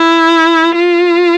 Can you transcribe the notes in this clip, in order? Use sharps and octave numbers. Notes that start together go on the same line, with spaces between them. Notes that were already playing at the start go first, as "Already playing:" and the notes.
Already playing: E4
F4